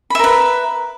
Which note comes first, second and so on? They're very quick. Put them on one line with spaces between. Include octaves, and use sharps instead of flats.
B5 E5 A#4 B4